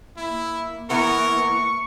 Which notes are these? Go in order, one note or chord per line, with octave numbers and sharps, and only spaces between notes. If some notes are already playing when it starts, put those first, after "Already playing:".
A#3 E4
E3 B3 A#4 C#6